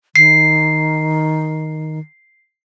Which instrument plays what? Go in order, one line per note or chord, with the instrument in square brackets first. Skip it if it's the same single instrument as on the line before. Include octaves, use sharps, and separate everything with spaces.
[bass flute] D#3 [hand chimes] C7